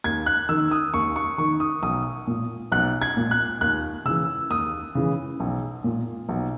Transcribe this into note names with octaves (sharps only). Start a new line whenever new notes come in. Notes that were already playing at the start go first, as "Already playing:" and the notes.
D#2 G#6
F#6
D#3 E6
D#6
D#2 C#6
C#6
D#3 C#6
D#6
B1 D#6
A#2
B1 F#6
G#6
A#2
F#6
D#2 F#6
C#3 E3 E6
D#2 D#6
C#3 E3
B1
A#2
B1